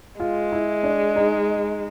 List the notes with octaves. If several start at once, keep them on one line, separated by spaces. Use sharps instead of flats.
G#3 F4
E4
D4
D#4